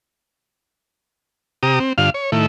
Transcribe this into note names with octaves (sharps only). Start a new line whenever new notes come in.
C3 G4 A#5 D#6
C4
G2 D3 F4 F5
C#5
A2 D#3 A3 E4